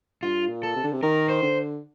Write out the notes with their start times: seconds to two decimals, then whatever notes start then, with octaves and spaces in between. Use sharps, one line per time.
0.22 G2 F4
0.49 A#2
0.63 A4
0.76 C3
0.84 D3
0.93 C3
1.03 D#3 A#4
1.29 C5
1.43 D3